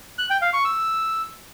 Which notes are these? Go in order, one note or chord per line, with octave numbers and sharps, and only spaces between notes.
F#6
G5
F5
C#6
E6